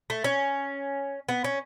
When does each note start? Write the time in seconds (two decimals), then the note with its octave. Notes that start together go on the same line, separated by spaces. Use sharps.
0.10 A3
0.24 C#4
1.29 B3
1.44 C#4